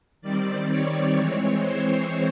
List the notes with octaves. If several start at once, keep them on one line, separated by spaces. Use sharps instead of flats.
D#3 G3 C4 D5
C#5
E3 G#3 C4
C5